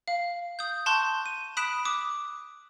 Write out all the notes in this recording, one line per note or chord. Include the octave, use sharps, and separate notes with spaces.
F5
D#6 G6
A5 C6 C#6 F#6 G6
D#7
B5 D#6 F#6 B6 D7 E7
D6 D#6